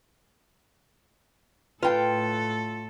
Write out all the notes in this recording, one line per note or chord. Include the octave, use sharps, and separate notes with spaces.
A2 F4 A4 B4 G5